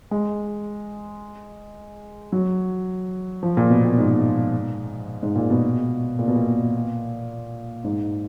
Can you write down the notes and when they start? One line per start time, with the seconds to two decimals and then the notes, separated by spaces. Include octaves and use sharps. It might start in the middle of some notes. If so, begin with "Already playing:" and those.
0.11 G#3
2.32 F#3
3.43 F3
3.57 A#2
3.70 B2
3.85 A#2
3.98 G#2
5.23 G#2
5.36 A#2
5.50 B2
6.19 A#2
6.28 B2
6.36 A#2
7.84 G#2